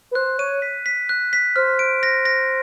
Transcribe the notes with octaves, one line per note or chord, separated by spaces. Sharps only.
B4
C5 F#6
C#5 D#7
B6
B6
F#6
B6
C5 F6
D7
A#6
A#6